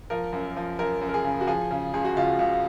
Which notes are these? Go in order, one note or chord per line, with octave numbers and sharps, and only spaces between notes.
F3 A#4
F#2
F3
F#2 A#4
F#2
A#4
G#4
C#3
F#4
F3 G#4
C#3
C#2 G#4
F#4
C#2 F4
C#2